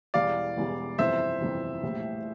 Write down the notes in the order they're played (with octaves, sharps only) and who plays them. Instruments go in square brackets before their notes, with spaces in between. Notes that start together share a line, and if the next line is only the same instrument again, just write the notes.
[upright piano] E1 E2 E3 G3 [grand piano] D5 F5
[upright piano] E1 E2 E3 G3
[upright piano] G1 F2 C3 E3 [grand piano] C5 E5
[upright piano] G1 F2 C3 E3
A#1 A2 E3 G3